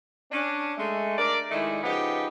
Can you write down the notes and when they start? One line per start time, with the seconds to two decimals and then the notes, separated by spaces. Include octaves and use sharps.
0.32 C#4 D4
0.78 G#3 A3
1.18 D4 A#4 D5
1.51 D#3 G#3 A3 E4 D5
1.84 C#3 F3 B3 D#4 G4